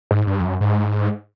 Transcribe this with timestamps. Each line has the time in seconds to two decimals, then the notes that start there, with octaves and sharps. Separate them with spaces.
0.11 G#2
0.27 G2
0.40 F2
0.44 F#2
0.61 G#2